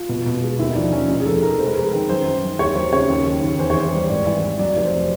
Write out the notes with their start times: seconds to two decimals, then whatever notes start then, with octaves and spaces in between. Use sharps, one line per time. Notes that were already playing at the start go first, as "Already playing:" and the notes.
Already playing: F4
0.09 B2
0.26 B2
0.42 G#3
0.59 D#2 E4
0.71 D#4
0.75 F3 D4
0.92 F3 C#4
1.09 F1 D#4
1.20 G#4
1.26 F1 A4
1.42 F1 A#4
1.59 G#3 C5
1.67 B4
1.74 G#3 A#4
1.82 B4
1.93 D#3
2.09 F#2 C5
2.26 D#3
2.43 F#2
2.59 D#2 C#5
2.75 F#3 C5
2.92 C#3 C#5
3.10 D#2
3.26 D#3
3.42 D#2
3.59 E2 C5
3.70 C#5
3.76 E2 C5
3.93 G3
4.09 G#1 D5
4.26 E3
4.43 E3
4.59 F#3 D5
4.76 F1
4.85 C5